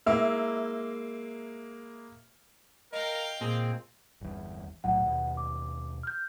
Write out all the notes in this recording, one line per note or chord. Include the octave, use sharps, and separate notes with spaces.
G#3 A#3 E4 E5
A#4 D#5 F5 G5 A#6
A#2 A#3 C4 G#4
G1 E2
B1 A2 F#3 F#5
D#2 B2
D6
F6 G6